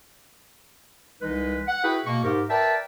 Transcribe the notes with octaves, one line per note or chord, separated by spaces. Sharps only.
C2 E3 G#3 D#4 B4
F#5
E4 F#4 G#4 B4 G5 B5
B2 A#3 C#6
G#2 G4 A#4
A#4 B4 D5 E5 G5 A5